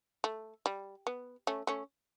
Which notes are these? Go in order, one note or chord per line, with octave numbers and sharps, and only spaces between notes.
A3
G3
B3
A3 C#4
A3 C#4